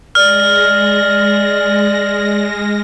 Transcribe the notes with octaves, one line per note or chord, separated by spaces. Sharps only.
G#3 D5 F6 A#6